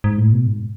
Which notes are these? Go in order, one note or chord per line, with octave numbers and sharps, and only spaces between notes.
G#2
A2
B2
G#2